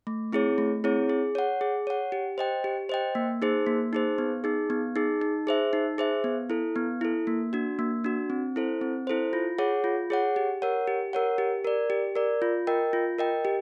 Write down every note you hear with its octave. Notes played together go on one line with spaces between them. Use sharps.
A3
C4 E4 G#4 C#5
A3
C4 E4 G#4 C#5
G#4
C#5 F#5
G#4
C#5 F#5
G4
C5 D#5 G5
G4
C5 D#5 G5
A#3
D#4 G#4 C5
A#3
D#4 G#4 C5
B3
D#4 G#4
B3
D#4 G#4
D#4
G#4 C5 E5
D#4
G#4 C5 E5
B3
E4 A4
B3
E4 A4
A#3
D4 F#4
A#3
D4 F#4
C4
E4 A4 C5
C4
E4 A4 C5
F4
G#4 C#5 F#5
F4
G#4 C#5 F#5
G4
A#4 C#5 F#5
G4
A#4 C#5 F#5
G4
A#4 D5
G4
A#4 D5
F4
A#4 D#5 G5
F4
A#4 D#5 G5
G4